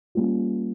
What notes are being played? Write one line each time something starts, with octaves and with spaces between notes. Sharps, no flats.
G3 A#3 C#4 F4